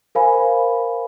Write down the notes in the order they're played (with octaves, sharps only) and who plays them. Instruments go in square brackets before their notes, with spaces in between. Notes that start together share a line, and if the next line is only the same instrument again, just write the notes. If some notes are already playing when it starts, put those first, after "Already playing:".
[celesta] A#4 C5 F5 G#5 B5